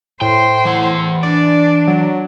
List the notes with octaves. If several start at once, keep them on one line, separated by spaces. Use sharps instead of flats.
A2 C5 G5
E3 F#5
D4 D5
F#3